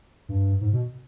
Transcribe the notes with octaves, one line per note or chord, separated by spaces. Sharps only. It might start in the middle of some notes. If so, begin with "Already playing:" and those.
G2
G#2
B2